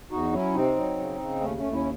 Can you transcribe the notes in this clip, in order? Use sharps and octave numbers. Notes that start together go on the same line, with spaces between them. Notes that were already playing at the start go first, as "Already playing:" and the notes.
E2 D#4 F#4
F#3 C#4 E4
C3 C4 D#4
F#3
C#3
C#3
D#2 A3 C#4
A3 C#4
D#2
C#4 E4